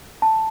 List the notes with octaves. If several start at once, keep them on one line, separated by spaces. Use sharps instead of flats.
A5